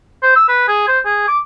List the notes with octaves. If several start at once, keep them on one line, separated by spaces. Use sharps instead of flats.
C5
E6
B4
G#4
C5
G#4
D6